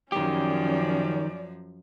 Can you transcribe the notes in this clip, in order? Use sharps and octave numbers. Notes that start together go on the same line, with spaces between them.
F#2 D#3 F3 C#4 G4 D5